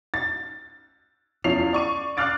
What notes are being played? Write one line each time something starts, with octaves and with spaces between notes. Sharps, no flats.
A6
E2 F3 C#4 E4 C7 F7
D5 C#6 D#7
F5 D6 F6 F#6 A6 D7